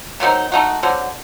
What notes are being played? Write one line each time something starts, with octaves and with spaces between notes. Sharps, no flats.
D#3 F#3 C4 D#4
A3 D#4 F#4
D3 F#3 C4